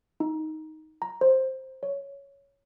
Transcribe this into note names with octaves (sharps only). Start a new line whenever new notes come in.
D#4
A#5
C5
C#5